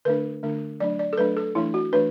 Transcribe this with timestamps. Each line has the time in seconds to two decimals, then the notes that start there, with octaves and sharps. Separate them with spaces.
0.05 D3 A3 D4 B4
0.43 D3 A3 D4
0.80 F#3 A3 D4 D5
0.99 D5
1.13 A4
1.18 F#3 A3 D4 B4
1.37 A4
1.55 E3 A3 D4 E4
1.74 F#4
1.93 E3 A3 D4 B4